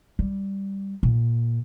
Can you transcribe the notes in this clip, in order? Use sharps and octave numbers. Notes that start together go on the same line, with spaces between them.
G3
A#2